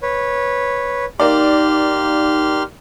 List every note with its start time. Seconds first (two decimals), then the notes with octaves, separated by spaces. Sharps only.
0.02 B4 C#5
1.20 A#3 D#4 G4 D5 C6 F6